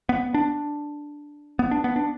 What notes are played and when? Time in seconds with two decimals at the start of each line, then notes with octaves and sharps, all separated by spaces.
0.09 B3
0.34 D4
1.59 B3
1.71 D4
1.84 B3
1.96 D4